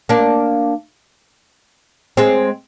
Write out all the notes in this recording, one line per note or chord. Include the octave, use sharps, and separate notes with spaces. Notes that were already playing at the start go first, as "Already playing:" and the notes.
A#3 D4
G#3 C4